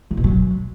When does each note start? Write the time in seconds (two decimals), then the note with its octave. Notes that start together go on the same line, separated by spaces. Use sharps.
0.11 D#3
0.17 B2
0.24 F#3